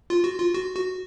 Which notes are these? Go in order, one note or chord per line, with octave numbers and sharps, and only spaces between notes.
F4
F#4
F4
F#4
F#4